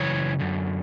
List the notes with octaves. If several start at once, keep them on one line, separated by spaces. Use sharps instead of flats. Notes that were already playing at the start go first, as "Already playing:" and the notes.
Already playing: F#2 C#3 E3 C#5
F#2 D3